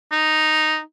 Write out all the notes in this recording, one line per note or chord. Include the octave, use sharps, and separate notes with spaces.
D#4